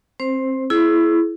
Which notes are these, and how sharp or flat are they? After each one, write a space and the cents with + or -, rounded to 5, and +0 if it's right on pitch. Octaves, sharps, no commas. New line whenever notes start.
C4 +25 C5 +0
E4 +15 G#4 +35